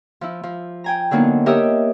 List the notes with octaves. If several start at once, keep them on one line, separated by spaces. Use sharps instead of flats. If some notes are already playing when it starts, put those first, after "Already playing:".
F3 E4
F3
G5 G#5 A#5
D3 F#3 A#3 B3 D#4
G4 A#4 C#5 D#5 E5 D#6